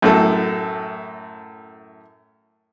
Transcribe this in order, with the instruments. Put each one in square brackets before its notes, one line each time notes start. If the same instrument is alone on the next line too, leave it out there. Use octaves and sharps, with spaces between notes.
[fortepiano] F#2 A2 A4